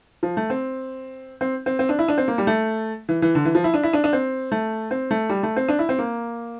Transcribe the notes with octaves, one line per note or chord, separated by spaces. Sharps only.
F3
A3
C4
C4
C4
C4
D4
E4
D4
C4
A#3
G3
A3
E3
E3
D3
E3
F3
E4
D4
E4
D4
D4
C4
A3
C4
A3
G3
A3
C4
D4
E4
C4
A#3